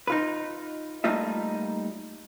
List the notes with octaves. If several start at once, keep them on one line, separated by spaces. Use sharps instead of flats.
D#4 F4 B4
G3 A3 A#3 D#4 F4 E5